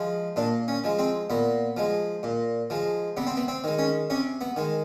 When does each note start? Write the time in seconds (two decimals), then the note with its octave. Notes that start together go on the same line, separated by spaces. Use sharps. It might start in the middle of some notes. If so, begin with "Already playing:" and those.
Already playing: F3 G#3
0.36 A#2 D4
0.68 C#4
0.84 F3 G#3
0.99 C4
1.30 A#2 B3
1.77 F3 G#3
2.23 A#2
2.70 F3 G#3
3.17 C3 B3
3.27 C4
3.37 B3
3.48 C4
3.64 D#3 G#3
3.79 C#4
4.10 C3 C#4
4.41 B3
4.56 D#3 G#3